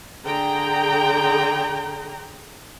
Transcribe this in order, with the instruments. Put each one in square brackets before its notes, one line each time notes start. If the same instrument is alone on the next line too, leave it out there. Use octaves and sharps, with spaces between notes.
[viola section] D3 G#4 G5 A#5